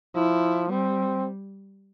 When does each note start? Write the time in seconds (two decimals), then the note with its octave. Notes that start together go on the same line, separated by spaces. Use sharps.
0.15 F3 E4
0.70 G3 C4